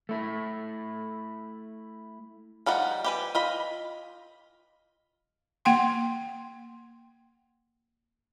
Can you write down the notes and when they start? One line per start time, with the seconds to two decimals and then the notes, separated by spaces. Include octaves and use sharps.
0.09 A3 E4
2.66 F3 G3 D#4 F#5
3.04 G4 B4 G#5
3.35 F4 D#5 B5
5.65 A#3 F#5 G5 C6